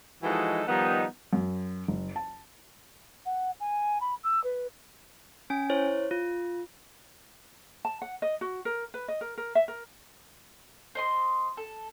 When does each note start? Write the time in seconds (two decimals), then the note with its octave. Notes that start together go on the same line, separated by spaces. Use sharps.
0.23 E3 F3 G#3 D#4 F#4 A4
0.68 D#3 F3 G3 B3 D#4
1.33 F#2
1.88 F#1
2.16 A5
3.25 F#5
3.60 G#5
4.01 B5
4.23 E6
4.44 B4
5.50 C#4 G#5
5.70 E4 C5 C#5
6.11 F4
7.85 A5
8.02 F#5
8.22 D#5
8.41 F#4
8.65 A#4
8.94 B4
9.08 D#5
9.21 A#4
9.38 A#4
9.55 E5
9.68 A#4
10.95 C5 D#5 C6
11.57 A4